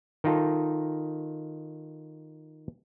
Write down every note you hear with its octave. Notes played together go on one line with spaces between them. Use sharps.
D#3 D#4 F4 A4